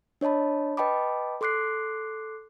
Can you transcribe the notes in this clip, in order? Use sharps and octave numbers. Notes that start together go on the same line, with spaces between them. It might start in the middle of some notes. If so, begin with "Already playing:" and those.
D4 C#5 D#5 A5 B5
B4 D#5 G5 A5 B5 D6
A4 C6 D6 F#6 C7